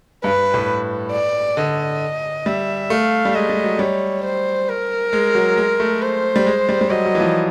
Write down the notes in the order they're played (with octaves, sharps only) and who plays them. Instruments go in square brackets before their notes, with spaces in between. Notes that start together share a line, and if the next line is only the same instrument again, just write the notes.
[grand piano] G2 [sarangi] B4
[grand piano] A2
[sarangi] D5
[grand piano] D3 [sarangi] D#5
[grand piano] G3 [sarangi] E5
[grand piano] A3 [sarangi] F5
[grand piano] G3
[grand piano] G#3 [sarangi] D#5
[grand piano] G3
F#3
[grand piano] G3 [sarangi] C#5
[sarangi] C5
A#4
[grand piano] G#3
F#3
G#3
A3
[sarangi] C5
[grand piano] G3
G#3
G3
G3
[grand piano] F#3 [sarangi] D#5
[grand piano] F#3
E3
F3